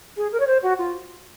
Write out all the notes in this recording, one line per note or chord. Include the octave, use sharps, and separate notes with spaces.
G#4
A#4
C#5
C5
F#4
F4